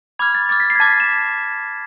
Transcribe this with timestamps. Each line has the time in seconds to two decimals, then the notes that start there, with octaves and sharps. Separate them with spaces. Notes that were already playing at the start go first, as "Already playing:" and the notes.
0.19 B5 D6 F6 G#6
0.35 A6
0.49 B5 D6 F6 A6
0.60 B6
0.70 C7
0.75 G#6
0.80 A5 D6 F6 A6
0.90 B6
1.00 E7